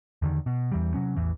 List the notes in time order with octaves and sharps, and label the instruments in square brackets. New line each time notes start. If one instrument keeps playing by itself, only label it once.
[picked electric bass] E2 D3 D#3
B2
E2 E3 G3
C3 F#3 C#4
A1 E2 E3